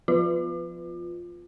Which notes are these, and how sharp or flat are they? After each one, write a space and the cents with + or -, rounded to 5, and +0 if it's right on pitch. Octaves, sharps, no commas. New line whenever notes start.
F3 +0 F4 +0